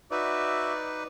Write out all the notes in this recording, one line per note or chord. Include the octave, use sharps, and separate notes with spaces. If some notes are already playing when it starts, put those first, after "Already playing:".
D#4 F#4 B4 D5 E5